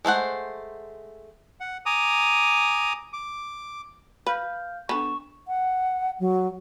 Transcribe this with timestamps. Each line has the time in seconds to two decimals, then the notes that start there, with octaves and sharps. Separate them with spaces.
0.05 G#3 A3 C5 F#5
1.60 F#5
1.86 G#5 A#5 D6 D#6
3.13 D6
4.26 B4 F5 F6 G6
4.89 B3 D4 A4 C#6 E7
5.48 F#5
6.20 F#3